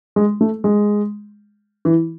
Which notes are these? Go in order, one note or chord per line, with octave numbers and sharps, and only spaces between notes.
G#3
A3
G#3
E3